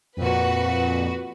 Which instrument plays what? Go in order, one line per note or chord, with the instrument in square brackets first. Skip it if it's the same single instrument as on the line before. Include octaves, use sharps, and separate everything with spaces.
[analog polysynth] F2 A#2 [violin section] F#4 B4